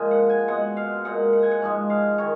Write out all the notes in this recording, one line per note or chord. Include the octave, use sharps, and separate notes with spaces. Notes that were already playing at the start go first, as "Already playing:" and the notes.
Already playing: A#2 F3 G#3 G#5
F#5
G#5
B2 G#3 F#5
F5
A#2 G#3 F#5
F#5
G#5
F#5
G#2 F3 G#3
F5
D#3 C#5